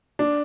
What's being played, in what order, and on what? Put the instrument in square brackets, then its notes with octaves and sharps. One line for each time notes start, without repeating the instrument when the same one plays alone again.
[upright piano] D4